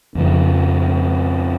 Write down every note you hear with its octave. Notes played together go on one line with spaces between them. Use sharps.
F2 C#3 F3